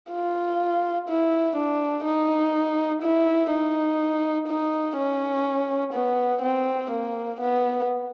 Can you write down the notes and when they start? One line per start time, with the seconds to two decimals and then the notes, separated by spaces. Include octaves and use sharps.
0.11 F4
1.09 E4
1.56 D4
2.05 D#4
3.02 E4
3.51 D#4
4.48 D#4
4.96 C#4
5.93 B3
6.42 C4
6.91 A#3
7.40 B3